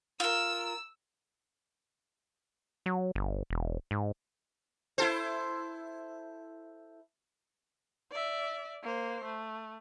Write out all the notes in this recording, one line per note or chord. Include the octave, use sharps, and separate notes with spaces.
F4 A#4 E6
F#3
G1
E1
G#2
E4 A4 C5
D5 E5
A#3 C5
A3